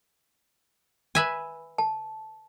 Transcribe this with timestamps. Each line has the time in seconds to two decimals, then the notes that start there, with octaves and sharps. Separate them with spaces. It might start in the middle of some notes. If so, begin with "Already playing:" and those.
1.15 B4 E5 G#5
1.78 A5